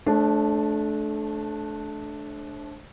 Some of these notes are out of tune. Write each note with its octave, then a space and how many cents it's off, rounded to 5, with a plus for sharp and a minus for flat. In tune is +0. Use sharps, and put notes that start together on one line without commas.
A3 -25 D4 +0 C5 +35